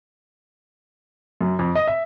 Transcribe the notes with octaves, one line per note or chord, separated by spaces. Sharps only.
F#2
F2
D#5
E5